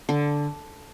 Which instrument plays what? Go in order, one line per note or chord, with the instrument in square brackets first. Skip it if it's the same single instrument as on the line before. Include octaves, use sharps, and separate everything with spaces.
[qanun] D3